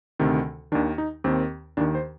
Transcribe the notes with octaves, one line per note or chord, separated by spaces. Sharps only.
D2 C3 D#3
D#2 D#3 D4
D#4
D#2 D#3 C4
D#2 D#3 D4
C5